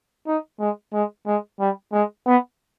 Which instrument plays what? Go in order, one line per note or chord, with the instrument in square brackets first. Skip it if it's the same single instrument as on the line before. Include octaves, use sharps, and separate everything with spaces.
[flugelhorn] D#4
G#3
G#3
G#3
G3
G#3
B3